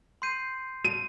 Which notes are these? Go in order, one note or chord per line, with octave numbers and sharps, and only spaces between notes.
C6 G6 C7 D#7
D#7